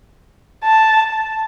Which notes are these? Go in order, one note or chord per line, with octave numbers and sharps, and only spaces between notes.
A5